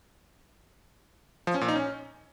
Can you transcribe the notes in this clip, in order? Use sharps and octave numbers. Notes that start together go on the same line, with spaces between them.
F3
C#4
A#2
D#4
C#4